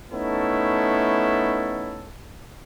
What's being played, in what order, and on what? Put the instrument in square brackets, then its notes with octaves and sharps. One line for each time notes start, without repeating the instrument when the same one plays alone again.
[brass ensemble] A3 B3 C#4 D#4 E4 A4